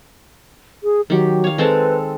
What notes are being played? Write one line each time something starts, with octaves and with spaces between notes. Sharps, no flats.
G#4
D#3 F#3 G4
C#5 F5
G#3 C4 A4 B4